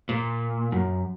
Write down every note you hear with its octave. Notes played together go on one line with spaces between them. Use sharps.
A#2
F#2